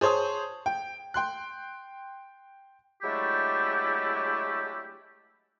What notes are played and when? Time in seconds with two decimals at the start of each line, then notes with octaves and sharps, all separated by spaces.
0.01 G#4 C5 C#5 A5 D#6
0.66 G5
1.14 G5 C6 F#6
3.02 F#3 G#3 A3 D4 E4 G4